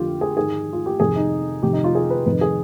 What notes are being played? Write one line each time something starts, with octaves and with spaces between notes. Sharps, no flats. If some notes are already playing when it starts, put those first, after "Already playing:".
Already playing: F2 D3 F4 G4
G#4
G#2 D#3 G#4
F4
G4
F2 C3 D#3 G#4
D#4
F2 C3 D#3 G4
D#4
F4
G#4
B4
F2 C3 D#3 B4
G#4